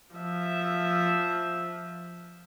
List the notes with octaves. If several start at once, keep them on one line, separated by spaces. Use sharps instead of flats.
F3 E5